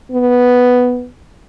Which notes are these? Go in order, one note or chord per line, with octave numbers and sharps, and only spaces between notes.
B3